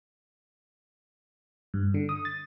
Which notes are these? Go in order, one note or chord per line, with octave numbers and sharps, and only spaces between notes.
G2
D3
D#6
A6